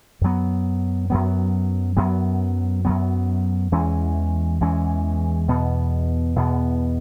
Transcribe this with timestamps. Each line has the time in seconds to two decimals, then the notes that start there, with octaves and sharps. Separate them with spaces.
0.21 F#2 F#3 B3
1.10 F#2 F#3 B3
1.97 F#2 F#3 B3
2.85 F#2 F#3 B3
3.72 E2 E3 G#3 C#4
4.60 E2 E3 G#3 C#4
5.48 E2 B2 B3
6.36 E2 B2 B3